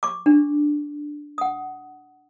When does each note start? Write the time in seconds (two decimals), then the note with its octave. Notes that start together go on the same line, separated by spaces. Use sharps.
0.03 C#6 D6
0.26 D4
1.38 F#5 D#6